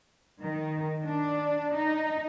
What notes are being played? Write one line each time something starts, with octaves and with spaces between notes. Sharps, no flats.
D#3
D4
D#4